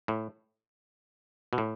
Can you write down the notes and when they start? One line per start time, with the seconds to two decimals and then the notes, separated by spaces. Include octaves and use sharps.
0.08 A2
1.53 B2
1.58 A2